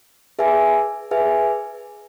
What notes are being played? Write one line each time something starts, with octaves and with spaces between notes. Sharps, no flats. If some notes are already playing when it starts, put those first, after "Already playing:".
G#4 B4 E5 G#5
G#4 B4 E5 G#5